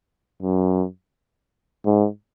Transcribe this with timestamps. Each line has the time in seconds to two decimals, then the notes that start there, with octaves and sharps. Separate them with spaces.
0.42 F#2
1.85 G#2